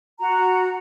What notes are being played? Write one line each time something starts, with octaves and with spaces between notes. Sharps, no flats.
F#4 A#5